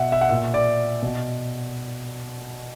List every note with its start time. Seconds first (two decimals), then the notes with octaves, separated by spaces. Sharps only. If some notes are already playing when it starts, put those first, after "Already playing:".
Already playing: B2 E5 F#5
0.12 E5
0.21 F#5
0.29 A#2 E5
0.54 D5
1.02 B2